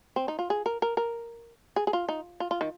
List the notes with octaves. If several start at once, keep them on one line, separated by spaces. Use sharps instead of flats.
C4
D#4
F4
G#4
A#4
A#4
A#4
G#4
G#4
F4
D#4
F4
F4
D#3